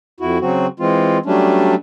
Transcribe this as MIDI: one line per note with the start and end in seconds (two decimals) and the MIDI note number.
0.20 0.38 41
0.20 0.38 64
0.20 0.38 66
0.41 0.67 49
0.41 0.67 54
0.41 0.67 60
0.41 0.67 66
0.80 1.18 52
0.80 1.18 56
0.80 1.18 60
0.80 1.18 65
1.26 1.75 54
1.26 1.75 55
1.26 1.75 57
1.26 1.75 61
1.26 1.75 62